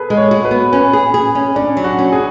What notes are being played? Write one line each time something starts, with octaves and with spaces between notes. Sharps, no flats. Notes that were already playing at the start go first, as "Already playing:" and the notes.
Already playing: G#4 A4 B4
G#3
C#5
F#4
B4
B3
C#4 B4
G#4
G#4
C#4
C#4 D4
F#3
F#4
C#4
G#4